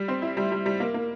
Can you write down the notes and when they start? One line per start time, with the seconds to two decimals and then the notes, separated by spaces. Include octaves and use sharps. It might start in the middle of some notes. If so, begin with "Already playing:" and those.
Already playing: G3
0.08 C4
0.22 E4
0.37 G3
0.52 G3
0.66 G3
0.80 A#3
0.94 A#3